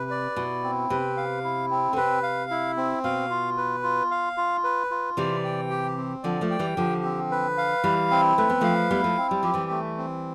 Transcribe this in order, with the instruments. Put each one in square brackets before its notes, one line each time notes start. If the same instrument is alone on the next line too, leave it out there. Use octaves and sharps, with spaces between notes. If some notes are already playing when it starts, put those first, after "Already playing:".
Already playing: [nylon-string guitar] C3 [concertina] B4
[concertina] D5
[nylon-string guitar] B2 [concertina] E4
[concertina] C4
[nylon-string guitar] C3 [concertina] B4
[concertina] F5
E4
C4
[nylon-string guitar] D3
[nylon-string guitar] C3 [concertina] B4
[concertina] F5
E4
C4
[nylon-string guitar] B2 [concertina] F5
[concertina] F4
B4
F4
F5
F4
B4
F4
[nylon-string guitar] C3 E3 [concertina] D5
[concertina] G5
G4
C4
[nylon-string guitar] D3 F3 [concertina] D5
[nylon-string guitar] F3 A3
[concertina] G5
[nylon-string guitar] E3 G3
[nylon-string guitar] D3 F3 [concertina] G4
[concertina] C4
B4
F5
[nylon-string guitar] E3 G3 [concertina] E4
[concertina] C4
[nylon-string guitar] A3 [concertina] B4
[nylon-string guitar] B3
[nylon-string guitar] F3 A3 [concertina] F5
[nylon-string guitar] G3 B3 [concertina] E4
[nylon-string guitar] F3 A3
[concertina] C4
[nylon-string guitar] G3
[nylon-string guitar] F3 [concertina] G4
[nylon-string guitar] E3 G3
[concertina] A3
C4